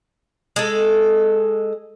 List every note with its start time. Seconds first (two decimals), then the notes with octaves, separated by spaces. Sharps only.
0.56 G#3 A4